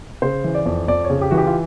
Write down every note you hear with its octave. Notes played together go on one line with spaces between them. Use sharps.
C#3 C5
E3
D5
F2
F2 D5
C#5
C#3
G4
E3 F#4
G4
F4